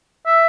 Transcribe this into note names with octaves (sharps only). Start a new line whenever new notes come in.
E5